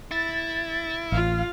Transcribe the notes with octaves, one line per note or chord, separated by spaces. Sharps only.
E4 A6
A1 F4 F5